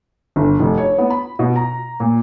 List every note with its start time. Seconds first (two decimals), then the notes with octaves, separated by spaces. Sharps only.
0.36 G1
0.59 F1
0.78 C#5
0.98 B3
1.10 B5
1.39 B2
1.56 A#5
2.00 A#2